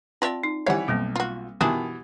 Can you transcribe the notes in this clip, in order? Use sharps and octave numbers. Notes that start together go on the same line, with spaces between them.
C4 F4 D5 E5 G5 A5
D#4
E3 G3 C#5 F5 F#5
B1 G3 A#3 C4
F4 F#4
B2 D#3 E3 D4 G4 D#6